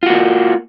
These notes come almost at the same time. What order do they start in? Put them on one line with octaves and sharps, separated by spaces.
F4 F#4 A#3